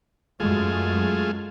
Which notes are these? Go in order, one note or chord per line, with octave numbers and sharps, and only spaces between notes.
F#2 G#3 A3 F4 G#4